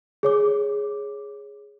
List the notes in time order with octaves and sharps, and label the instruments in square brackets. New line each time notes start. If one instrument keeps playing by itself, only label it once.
[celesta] G#4 C#5 D6